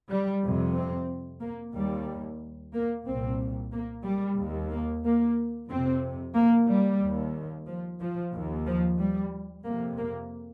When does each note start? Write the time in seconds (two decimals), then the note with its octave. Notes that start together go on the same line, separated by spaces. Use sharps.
0.10 G3
0.43 F2 C3
0.75 C4
1.41 A#3
1.74 D#2 G3
2.73 A#3
3.06 C2 A#2 C4
3.71 A#3
4.05 G3
4.38 D#2
4.70 A#3
5.04 A#3
5.70 F2 C3 C4
6.36 A#3
6.69 G3
7.01 D#2
7.67 F3
8.00 F3
8.34 D#2
8.66 F3
8.99 G3
9.64 F2 C3 A#3
9.97 A#3